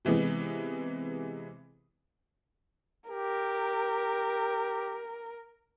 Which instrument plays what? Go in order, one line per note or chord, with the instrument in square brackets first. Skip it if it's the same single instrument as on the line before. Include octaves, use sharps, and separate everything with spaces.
[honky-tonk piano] C3 E3 G#3 B3
[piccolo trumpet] G4 [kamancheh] A#4